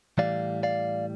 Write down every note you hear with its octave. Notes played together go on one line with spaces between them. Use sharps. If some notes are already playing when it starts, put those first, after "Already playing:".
A2 E3 G3 D5 F5
D5 F5